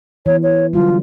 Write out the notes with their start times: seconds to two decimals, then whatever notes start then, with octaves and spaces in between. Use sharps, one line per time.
0.26 E3 B3 C#5
0.43 C#5
0.73 D3 F#3 G3 F4